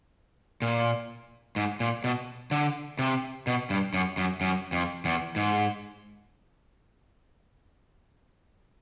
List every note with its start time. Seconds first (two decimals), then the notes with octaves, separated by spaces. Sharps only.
0.62 A#2
1.56 G#2
1.80 A#2
2.04 B2
2.51 D3
2.99 C3
3.47 B2
3.70 G2
3.94 F#2
4.17 F#2
4.41 F#2
4.72 F2
5.05 E2
5.36 G#2